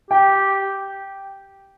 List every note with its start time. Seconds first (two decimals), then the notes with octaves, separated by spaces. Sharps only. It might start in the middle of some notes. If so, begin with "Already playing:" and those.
0.11 G4 G5